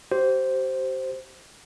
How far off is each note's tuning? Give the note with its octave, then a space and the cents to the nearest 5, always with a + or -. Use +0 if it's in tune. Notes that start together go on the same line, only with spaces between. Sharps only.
G4 -35 C5 +0